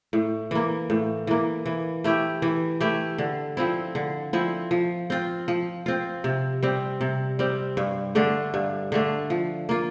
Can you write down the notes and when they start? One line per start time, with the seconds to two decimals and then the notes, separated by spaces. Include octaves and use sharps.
0.13 A2
0.51 E3 A#3
0.90 A2
1.27 E3 A#3
1.66 E3
2.04 A3 E4 G4
2.42 E3
2.80 A3 E4 G4
3.18 D3
3.57 F3 C4 E4
3.95 D3
4.33 F3 C4 E4
4.71 F3
5.10 C4 F4
5.48 F3
5.86 C4 F4
6.24 C3
6.63 G3 C4
7.01 C3
7.39 G3 C4
7.77 G2
8.15 D3 A3 D4
8.54 G2
8.92 D3 A3 D4
9.30 F3
9.69 A#3 F4